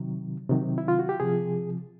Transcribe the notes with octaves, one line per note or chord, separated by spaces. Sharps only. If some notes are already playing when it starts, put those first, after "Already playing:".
Already playing: C3 D#3 F#3
C3 D#3 F#3
E4
F4
F#4
G4
C3 F3 G#4